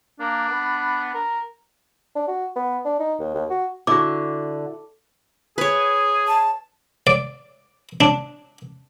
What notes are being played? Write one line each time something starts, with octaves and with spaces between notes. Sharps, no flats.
A#3 D4
B3 B5
A#4
D4
F#4
B3
D4
D#4
D#2
D#2
F#4
D3 E4 F#4 D6
G#4 B4 C#5
A5
D5
D4